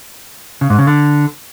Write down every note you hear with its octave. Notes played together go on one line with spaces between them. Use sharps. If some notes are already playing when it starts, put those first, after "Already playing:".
C#3
G#2
C#3
D3